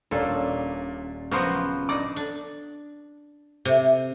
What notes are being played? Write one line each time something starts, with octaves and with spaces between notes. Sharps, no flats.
D#1 A#2 C#4 D4 A4 D5
C#3 F3 F#3 B3 A#4 C5 C6 C#6
D4 D#4 D5 D6 D#6
D4
C3